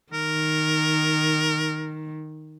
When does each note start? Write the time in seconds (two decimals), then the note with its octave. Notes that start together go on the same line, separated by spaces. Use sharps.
0.13 D#3 A#4